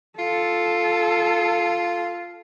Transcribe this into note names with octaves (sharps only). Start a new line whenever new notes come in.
F4 A4